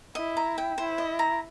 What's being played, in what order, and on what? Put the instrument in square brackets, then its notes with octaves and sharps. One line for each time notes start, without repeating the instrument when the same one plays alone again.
[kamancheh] E4 [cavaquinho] D#5
[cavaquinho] A#5
G5
[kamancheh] E4 [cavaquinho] C5
[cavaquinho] D#5
A#5